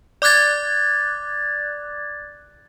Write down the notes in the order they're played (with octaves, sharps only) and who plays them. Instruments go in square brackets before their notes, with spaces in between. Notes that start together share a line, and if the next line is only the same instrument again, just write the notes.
[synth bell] D5 D6 F#6 G#6 A6